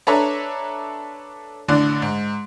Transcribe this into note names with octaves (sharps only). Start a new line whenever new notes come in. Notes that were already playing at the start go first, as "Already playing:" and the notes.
D4 A4 B4 C#5 E5 A#5
A1 D3 D4
G#2